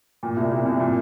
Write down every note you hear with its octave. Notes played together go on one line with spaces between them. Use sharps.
A#2
C2
C2
C2
A#2